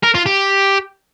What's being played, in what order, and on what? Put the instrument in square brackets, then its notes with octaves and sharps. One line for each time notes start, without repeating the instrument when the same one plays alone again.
[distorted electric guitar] A#4
F4
G4